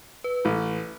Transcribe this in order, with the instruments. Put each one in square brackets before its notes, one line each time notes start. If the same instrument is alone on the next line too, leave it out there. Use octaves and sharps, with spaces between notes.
[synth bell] B4
[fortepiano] A1